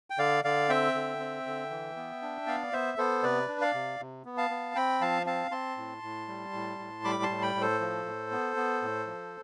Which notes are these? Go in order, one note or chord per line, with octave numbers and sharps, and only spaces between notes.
G5
D3 D5 F5
D3 D5 F5
C4 E5 G5
D3
C4
D3
E3
B3
D4
B3 D5 F5
B3 C5 E5
B3 A4 C5
C3 B4 D5
D4
D5 F5
C3
C3
B3
F5 A5
B3
C4 G5 B5
F3 F5 A5
C4 F5 A5
C4 A5 C6
A2
A2
G3
A2
A2
G3 B5 D6
A5 C6
A2
G5 B5
A2
A4 C5
F3
A2
B3
B3
A2
F3